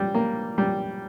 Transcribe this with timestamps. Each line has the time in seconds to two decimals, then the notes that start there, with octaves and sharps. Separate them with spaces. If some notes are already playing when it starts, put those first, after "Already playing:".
Already playing: G3
0.14 A#3
0.58 G3